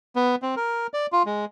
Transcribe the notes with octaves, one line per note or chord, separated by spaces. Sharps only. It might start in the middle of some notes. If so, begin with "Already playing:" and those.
B3
C4
A#4
D5
F4
G#3